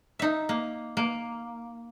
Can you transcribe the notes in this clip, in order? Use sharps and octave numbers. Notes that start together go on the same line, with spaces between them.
D#4 E5
A#3
A#3